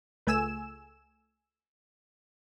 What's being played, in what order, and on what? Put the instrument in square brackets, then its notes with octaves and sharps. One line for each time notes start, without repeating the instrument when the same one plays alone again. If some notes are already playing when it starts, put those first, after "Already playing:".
[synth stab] C#2 A3 G#5 E6 E7